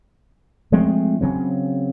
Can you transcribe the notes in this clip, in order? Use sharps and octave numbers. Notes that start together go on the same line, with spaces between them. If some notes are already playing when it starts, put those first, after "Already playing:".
F3 G#3 A3 C4
C#3 F#3 C4